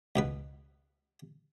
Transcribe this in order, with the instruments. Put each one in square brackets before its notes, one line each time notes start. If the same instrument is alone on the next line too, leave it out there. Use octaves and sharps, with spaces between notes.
[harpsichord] C#2 B2 B4